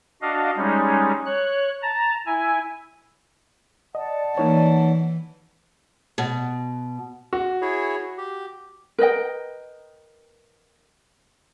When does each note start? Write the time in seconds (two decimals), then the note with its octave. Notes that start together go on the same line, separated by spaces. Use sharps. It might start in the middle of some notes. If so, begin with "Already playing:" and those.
0.22 D4 F#4 D#5 F5
0.56 G3 G#3 C#4 D#4
1.26 C#5 F#6
1.82 A5 A#5
2.26 E4 G#5
3.95 D5 D#5 F#5 A5
4.38 E3 A#3 D#4 C#5
6.18 B2
7.33 F#4
7.62 E4 G#4 C#5
8.18 G4
8.99 A#4 B4 D#5 G5